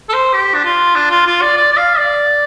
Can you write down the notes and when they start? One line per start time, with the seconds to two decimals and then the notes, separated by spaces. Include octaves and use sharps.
0.09 A4
0.13 C5
0.33 G4
0.54 D4
0.64 F4
0.95 D4
1.11 F4
1.26 F4
1.41 D5
1.57 D5
1.73 D5
1.77 F5
1.98 D5